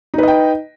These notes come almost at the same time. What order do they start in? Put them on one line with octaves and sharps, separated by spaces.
D#4 B4 D#5 G5